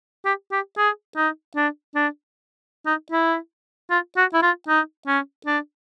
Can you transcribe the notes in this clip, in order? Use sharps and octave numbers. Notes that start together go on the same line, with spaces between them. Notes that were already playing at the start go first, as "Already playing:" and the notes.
G4
G4
G#4
D#4
D4
D4
D#4
E4
F4
F#4
E4
F4
D#4
C#4
D4